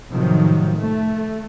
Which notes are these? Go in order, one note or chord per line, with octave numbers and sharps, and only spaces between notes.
A2 C3 D#3 F3 F#3
A3